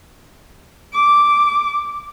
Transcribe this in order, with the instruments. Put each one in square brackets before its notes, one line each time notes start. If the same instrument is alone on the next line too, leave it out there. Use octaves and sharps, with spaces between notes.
[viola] D6